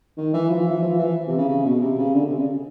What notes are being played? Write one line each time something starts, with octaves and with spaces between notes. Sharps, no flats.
D#3
E3
F3
E3
F3
E3
C3
C#3
C#3
B2
C3
C#3
D3
C3
C#3